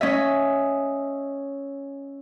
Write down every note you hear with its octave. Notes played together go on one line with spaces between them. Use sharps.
C#4 D#5 E5